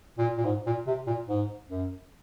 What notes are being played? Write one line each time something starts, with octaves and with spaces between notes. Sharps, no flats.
A#2
A#2
G#2
A#2
C3
A#2
G#2
F#2